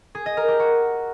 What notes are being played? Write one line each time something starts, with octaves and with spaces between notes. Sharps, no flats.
G#4
D#5
A#4
G4
F#4